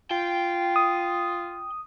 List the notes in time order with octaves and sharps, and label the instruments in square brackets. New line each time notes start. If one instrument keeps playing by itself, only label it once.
[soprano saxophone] F4 [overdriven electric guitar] G5
[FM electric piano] D#6